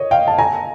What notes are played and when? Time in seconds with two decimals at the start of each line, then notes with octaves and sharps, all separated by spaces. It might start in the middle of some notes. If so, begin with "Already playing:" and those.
Already playing: C#5 D#5
0.11 F5 G5
0.27 A5
0.39 G#5 A#5